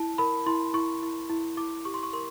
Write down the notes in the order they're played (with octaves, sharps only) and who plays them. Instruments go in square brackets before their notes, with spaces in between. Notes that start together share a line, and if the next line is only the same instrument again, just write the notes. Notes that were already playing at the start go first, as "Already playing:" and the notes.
Already playing: [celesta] E4 A5
A#4 B5
E4 C6
E4 C#6
E4
E4
E4 D6
G4 C#6
C6
C#6
A#4 C6